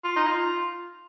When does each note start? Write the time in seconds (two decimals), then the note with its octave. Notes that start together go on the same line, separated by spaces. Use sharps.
0.04 F4
0.16 D#4
0.27 F4